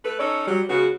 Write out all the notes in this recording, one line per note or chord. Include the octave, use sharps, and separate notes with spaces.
A3 B4
C#4 D#4 A4 C#5 D5
F#3 G3
C#3 G#3 B3 F#4